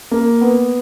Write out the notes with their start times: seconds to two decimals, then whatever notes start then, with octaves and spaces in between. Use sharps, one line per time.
0.11 A#3
0.41 B3